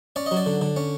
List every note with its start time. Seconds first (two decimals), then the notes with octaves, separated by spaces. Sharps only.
0.16 C#4 D5
0.26 D#5
0.31 F#3
0.37 D5
0.46 D3
0.61 D3
0.77 C#4